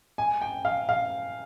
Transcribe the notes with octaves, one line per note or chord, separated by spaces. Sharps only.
G#5
G5
F5
F5